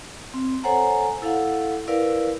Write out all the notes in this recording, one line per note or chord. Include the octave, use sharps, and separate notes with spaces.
C4
A4 C5 C#5 F#5 G#5 A#5
E4 A4 F5 F#5
E4 A#4 B4 D5 F5